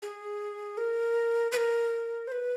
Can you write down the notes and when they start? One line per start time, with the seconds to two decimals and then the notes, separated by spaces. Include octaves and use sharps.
0.02 G#4
0.77 A#4
1.52 B4
1.57 A#4
2.27 C5
2.32 B4